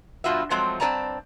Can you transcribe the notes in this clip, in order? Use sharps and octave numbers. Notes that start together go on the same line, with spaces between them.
G2 B2 F4 F#4 E5
F3 F#3 G#3 A3 C4
G2 C4 B4 D5 A5 A#5